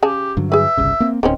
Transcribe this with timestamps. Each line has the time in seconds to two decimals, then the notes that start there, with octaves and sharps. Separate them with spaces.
0.03 C#3 G4 G#4 A5
0.37 G2 D3 F#3
0.52 G#4 B4 E5
0.77 G1 C2 C#3
1.00 A#3 C4
1.23 D1 D#3 C4 C#4